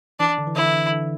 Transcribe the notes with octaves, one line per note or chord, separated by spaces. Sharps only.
E3 D4
D3
E3
D3 E4
E3
D3
D3